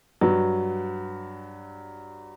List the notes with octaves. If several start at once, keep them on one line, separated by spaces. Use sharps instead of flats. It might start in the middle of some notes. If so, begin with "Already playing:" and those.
G2 F#3